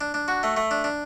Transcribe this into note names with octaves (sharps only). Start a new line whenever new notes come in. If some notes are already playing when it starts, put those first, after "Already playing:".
D4
D4
F#4
A3
A3
D4
D4